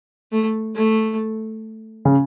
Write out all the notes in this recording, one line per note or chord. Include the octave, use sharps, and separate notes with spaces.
A3
A3
C#3